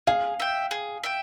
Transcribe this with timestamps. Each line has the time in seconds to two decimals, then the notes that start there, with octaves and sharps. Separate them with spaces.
0.07 G#4 F5
0.40 E5 G5
0.71 G#4
1.04 E5 G5